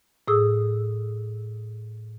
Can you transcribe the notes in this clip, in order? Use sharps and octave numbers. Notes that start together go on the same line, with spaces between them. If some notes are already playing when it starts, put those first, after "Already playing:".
A2 G#4 D#6 E6